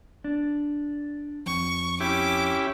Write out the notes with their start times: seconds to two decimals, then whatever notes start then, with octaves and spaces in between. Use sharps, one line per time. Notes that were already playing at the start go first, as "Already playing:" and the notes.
0.24 D4
1.46 F2 C#6
2.00 C#4 E4 G4 D6